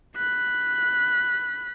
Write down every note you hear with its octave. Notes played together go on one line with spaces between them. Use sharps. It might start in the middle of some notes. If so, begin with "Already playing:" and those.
B5 F#6